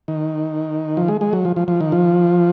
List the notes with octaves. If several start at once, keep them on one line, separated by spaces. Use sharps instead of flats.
D#3
F3
G#3
G#3
F#3
F3
F3
F3
D#3
F3